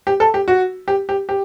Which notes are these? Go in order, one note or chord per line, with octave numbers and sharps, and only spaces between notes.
G4
A4
G4
F#4
G4
G4
G4